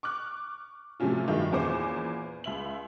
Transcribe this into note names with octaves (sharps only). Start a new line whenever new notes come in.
C#6 D6 F6 F#6
A2 C3 F3 F#3 C#4 F4
G2 D#3 F#3 G#3 A3
E2 A#2 B3 C#4 C5 D6
C#2 E5 F#7